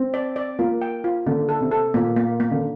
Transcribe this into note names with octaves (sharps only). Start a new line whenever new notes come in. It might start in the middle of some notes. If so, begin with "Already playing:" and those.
Already playing: C4
D5
D5
A#3 F4
G5
F4
D3 A#3
A4
C3
A4
A#2 A#3
A#3
A#3
D3